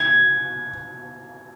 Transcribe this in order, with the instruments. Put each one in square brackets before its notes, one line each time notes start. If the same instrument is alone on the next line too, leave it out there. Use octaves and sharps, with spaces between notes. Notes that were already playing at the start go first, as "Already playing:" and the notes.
Already playing: [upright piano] G#6